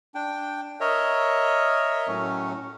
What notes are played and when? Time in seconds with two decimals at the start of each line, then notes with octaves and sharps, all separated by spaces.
0.15 D4 G5
0.80 A#4 C#5 D#5 E5
2.08 A2 F#3 A3 C#4